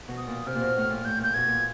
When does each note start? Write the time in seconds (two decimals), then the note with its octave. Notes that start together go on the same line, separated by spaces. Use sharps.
0.08 B2
0.18 D#6
0.27 A#2
0.46 C3 F6
0.55 A#2
0.61 B2
0.77 A2
0.90 A#2
1.05 A2 G6
1.19 A#2 G6
1.34 B2 G#6
1.48 A#2